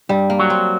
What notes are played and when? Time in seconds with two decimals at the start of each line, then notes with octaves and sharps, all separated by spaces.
0.09 G2 G3
0.30 A#3
0.39 F#3
0.50 C4